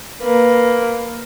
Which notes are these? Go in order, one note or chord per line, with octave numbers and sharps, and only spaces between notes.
A#3 B4